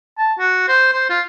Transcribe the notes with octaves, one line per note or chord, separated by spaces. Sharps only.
A5
F#4
C5
C5
F4